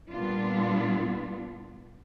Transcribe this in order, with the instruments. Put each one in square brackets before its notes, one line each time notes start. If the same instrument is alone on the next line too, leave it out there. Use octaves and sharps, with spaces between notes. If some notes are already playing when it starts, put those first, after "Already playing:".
[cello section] A#2 G3 B3 D4 F4